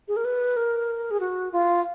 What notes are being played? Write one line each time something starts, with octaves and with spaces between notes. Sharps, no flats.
G#4
A#4
B4
A#4
G#4
F#4
F4